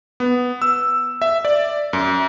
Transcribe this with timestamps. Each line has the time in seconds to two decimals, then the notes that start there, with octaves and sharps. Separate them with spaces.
0.20 B3
0.62 E6
1.22 E5
1.45 D5
1.93 F#2